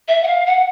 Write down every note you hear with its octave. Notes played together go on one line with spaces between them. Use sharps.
E5
F#5
F5
F#5